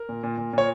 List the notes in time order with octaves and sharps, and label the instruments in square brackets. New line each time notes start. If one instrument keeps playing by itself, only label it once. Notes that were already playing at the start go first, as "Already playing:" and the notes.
Already playing: [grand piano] A#4
A#2
A#2
A#2
A#2 C#5